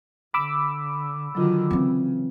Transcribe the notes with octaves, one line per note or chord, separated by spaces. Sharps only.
D3 B5 D6 E6
D3 D#3 F#3 F4 F#4
C#3 E3 C4